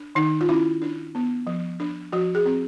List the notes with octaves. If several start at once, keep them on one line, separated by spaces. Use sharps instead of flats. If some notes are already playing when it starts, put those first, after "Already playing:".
Already playing: D4
D#3 D#4
F4
C#4 E4
D4
B3
F3
D4
F3 F#4
G#4
C4